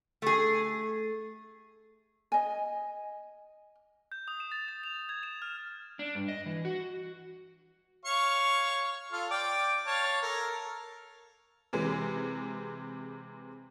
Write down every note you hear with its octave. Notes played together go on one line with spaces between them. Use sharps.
A3 G#4
D#5 G#5
G6
D#6
E7
A6
A6
F7
G#6
E7
F6
D4
G2
D#5
E3
F#4
C#5 F5 C#6
F4 A4 F6
D5 G5
C#5 F5 A5
A4 A#4
C3 E3 G#3